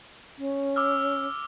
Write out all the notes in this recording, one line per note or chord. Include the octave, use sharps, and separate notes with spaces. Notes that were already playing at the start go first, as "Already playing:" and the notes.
C#4
D6 E6 F6